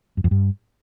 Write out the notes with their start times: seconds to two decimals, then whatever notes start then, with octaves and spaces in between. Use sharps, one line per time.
0.17 F#2
0.24 F2
0.31 G2